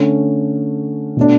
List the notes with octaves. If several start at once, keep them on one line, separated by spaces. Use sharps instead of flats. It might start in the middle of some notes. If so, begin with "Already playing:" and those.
Already playing: D3 A3 C#4
B2 A3 D4